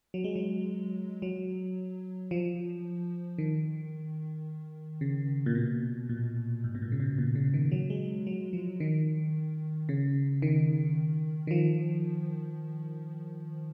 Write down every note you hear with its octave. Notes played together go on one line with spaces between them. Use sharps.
F#3
G#3
F#3
F#3
F3
D#3
C#3
A#2
B2
A#2
G#2
B2
A#2
C#3
B2
A#2
C#3
D#3
F#3
G#3
F#3
F3
D#3
C#3
D#3
D#3
F3